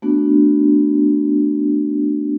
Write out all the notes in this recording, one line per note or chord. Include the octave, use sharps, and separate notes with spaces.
A3 B3 D4 F#4